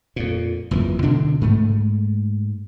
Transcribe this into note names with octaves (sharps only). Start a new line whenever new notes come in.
F2 A#2
F#1 F2 E3
D2 B2 D3 D4
G#2 A3